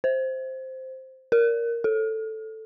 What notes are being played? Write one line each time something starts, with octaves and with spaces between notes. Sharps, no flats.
C5
A#4
A4